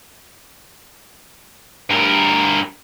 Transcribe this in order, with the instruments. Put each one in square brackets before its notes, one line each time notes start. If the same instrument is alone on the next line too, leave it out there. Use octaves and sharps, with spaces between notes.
[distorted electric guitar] G2 A#4